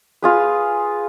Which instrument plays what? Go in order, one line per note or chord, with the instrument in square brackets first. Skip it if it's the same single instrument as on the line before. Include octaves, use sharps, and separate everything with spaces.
[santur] F4 G#4 B4